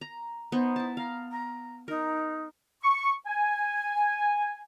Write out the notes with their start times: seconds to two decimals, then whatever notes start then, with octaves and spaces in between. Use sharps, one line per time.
0.01 A#5
0.52 B3 D#4 C5
0.76 E4 A5
0.97 F5 A#5
1.31 A#5
1.88 D#4 A#4
2.82 C#6
3.26 G#5